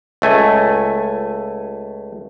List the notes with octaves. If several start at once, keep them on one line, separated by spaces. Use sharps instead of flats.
C#2 A3 G#5